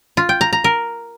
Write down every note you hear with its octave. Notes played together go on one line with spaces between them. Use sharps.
F4
G5
A#5
A#5
A#4